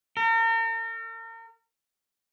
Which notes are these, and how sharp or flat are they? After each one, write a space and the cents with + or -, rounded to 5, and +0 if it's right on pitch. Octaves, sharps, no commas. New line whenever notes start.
A#4 -40